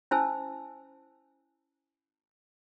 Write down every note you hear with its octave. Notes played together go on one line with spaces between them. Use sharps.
C#4 E4 C5 G#5 A5 E6